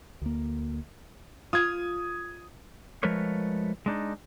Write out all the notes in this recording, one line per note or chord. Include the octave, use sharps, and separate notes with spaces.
D2 A#3
F4 D#6 G#6
F3 G#3 A3 A#4 B4 C#5
G#3 D4 D#4